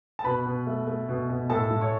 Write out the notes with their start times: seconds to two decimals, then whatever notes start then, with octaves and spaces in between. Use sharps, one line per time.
0.19 A5
0.24 B2 B4 B5
0.46 B2
0.67 A3
0.87 A3
1.09 B2
1.30 B2
1.50 A2 A4 A5
1.71 A2
1.81 C#5 C#6